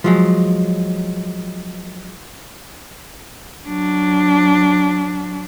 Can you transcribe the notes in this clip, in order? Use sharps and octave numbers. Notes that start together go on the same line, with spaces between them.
F3 F#3 G#3
F#3 D4